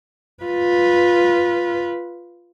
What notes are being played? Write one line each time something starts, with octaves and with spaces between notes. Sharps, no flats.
F4 B4